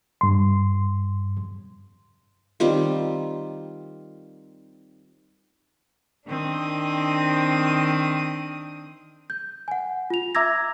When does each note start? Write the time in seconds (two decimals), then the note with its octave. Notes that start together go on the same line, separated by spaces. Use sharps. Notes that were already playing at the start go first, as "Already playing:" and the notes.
0.21 G2 C6
2.60 D#3 G3 C4 F4
6.28 D#3 C4 D4 D#6
9.30 G6
9.68 F#5 G#5
10.10 F4 F7
10.35 E5 A#5 D6 E6 G#6 A#6